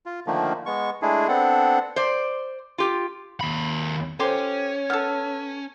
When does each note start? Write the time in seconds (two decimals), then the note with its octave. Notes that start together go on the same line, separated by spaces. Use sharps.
0.06 F4
0.27 D3 D#3 F3 A3 A#3
0.66 G#3 B3 C#6
1.02 G#3 A3 D4 E4 G#4
1.28 B3 C4 D4 A4 F#5
1.96 C5 D5
2.78 F4 G4
3.41 D#2 B5
4.20 F3 C#4 G4 A4 C5 C#5 C6
4.90 B3 A4 E6 F6